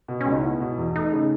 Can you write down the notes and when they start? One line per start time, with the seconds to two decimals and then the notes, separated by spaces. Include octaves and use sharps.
0.08 B2
0.21 C#4
0.26 C#2
0.32 D#4
0.43 B3 E4
0.60 B2
0.78 E2
0.96 A3 D#4
1.12 C#3